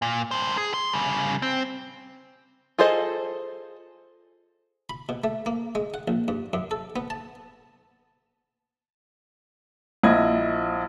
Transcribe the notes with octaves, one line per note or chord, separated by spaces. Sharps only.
A#2
G2 C5
G#4
C6
C#3 G3
C4
F4 G#4 A4 C5 D#5
B5
B2
A3
A#3
G#3
F#5
A#1
G2
F#2
A4
B3
A5
A#1 E4 D#5 G#6